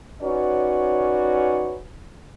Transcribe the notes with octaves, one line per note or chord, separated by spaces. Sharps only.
C#4 D#4 F#4 B4 C#5 D5